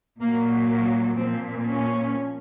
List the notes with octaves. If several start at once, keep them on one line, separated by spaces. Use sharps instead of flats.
A#2 F#3 A#3
A#3
A#2 F3 C4
C#4